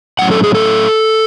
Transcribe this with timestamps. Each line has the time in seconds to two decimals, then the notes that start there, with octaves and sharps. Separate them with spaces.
0.19 A2 F#3 C#4 F#5
0.31 A4
0.44 G#4
0.55 A4